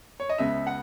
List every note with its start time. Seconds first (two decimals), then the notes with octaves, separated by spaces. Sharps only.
0.20 C#5
0.29 D#5
0.38 C#2 C#3 G#3 B3 E5
0.67 F#5